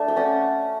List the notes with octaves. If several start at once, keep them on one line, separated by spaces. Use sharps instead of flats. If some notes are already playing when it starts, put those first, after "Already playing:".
Already playing: A3 D4 E5
G5
C#4 D5 F#5